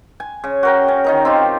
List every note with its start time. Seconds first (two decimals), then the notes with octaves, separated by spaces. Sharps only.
0.20 G#5
0.44 C#3
0.63 F#4 A#4 G5
0.88 C#4
1.04 D#3 D#4 A#4
1.25 C4 F4 G4